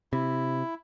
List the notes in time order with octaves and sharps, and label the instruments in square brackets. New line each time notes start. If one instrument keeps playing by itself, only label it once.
[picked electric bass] C3 [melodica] E4